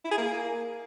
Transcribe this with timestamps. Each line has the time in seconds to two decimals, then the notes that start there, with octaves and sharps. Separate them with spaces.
0.05 E4
0.11 G#4
0.18 A#3